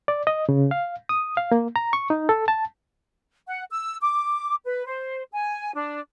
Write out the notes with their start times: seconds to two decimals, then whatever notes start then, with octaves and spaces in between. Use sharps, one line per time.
0.08 D5
0.27 D#5
0.49 C#3
0.71 F5
1.09 D#6
1.37 F5
1.52 A#3
1.76 A#5
1.93 C#6
2.10 D#4
2.29 A4
2.48 A5
3.48 F#5
3.70 E6
4.01 D6
4.65 B4
4.86 C5
5.32 G#5
5.74 D4